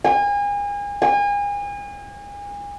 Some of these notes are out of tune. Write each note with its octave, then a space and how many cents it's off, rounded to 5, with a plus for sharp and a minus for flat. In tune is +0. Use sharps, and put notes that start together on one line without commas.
G#5 -35
G#5 -35